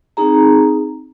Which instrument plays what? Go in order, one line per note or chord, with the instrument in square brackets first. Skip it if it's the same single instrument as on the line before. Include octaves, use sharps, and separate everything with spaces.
[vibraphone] C4 D#4 G#4 A#5